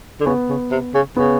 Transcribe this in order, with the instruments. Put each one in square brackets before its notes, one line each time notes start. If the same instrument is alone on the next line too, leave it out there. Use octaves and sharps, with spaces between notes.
[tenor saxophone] D3
[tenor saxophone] C#3 [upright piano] B3
[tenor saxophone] C#3
C3
C#3
[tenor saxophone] C#3 [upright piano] B3